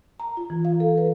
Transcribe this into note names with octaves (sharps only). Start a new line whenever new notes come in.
A#5
F4
E3
F5
A4
B4